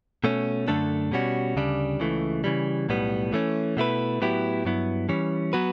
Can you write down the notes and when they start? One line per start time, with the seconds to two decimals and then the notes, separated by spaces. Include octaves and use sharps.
0.24 B2 A3 C#4
0.68 F#2 D3 A3 D4 A4
1.12 B2 G3 C#4 F#4
1.56 D2 C#3 G3 D4
2.00 C#2 C#3 E3 A3
2.44 C#3 E3 G3
2.88 B1 A2 G3 B3
3.33 E3 A3 C#4
3.77 B2 A3 E4 B4
4.21 A2 F#3 B3 E4 G4
4.65 G2 F#3 B3 E4
5.09 E3 G3 C#4
5.53 F#3 B3 F#4 B4